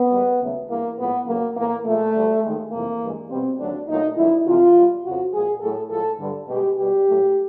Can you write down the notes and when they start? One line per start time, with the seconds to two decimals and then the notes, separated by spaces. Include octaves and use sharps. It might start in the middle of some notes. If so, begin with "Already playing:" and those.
Already playing: B3
0.10 G#2 D#3 G3
0.40 D#2 C#3 F#3 A3
0.68 G2 E3 G#3 A#3
0.98 A2 F3 G#3 B3
1.26 E2 C#3 F#3 A3 A#3
1.55 A2 E3 A3 A#3
1.85 A#2 F3 G#3 A3
2.13 D2 D3 G3
2.43 D#2 D#3 G#3
2.71 F2 C3 E3 A#3
3.01 G2 E3 G#3
3.29 B2 G3 C4
3.59 D#2 D3 F#3 A3 D4
3.88 A#2 F#3 A3 D#4
4.16 F#2 D3 F3 G#3 E4
4.45 F2 C3 E3 F4
4.74 B2 G3
5.04 F2 C#3 F3 F#4
5.32 A#2 F3 G#3 G#4
5.61 A2 F#3 A3 A4
5.90 A2 F3 G#3 A4
6.19 G2 D3 G3
6.48 B2 G#3 G4
6.77 B2 G3 G4
7.07 A2 F#3 A3